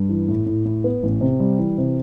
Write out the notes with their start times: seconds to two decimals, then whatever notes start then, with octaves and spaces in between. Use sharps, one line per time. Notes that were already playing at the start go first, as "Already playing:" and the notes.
Already playing: G2
0.09 E3
0.28 A2
0.46 A2
0.65 A2
0.84 B3
1.03 A1
1.21 C3
1.40 G3
1.58 E3
1.78 C3